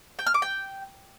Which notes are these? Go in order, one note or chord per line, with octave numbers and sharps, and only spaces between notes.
G5
F6
D6
G5